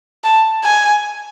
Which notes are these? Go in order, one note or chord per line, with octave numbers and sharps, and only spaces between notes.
A5
G#5